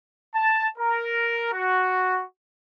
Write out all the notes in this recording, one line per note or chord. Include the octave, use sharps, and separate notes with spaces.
A5
A#4
F#4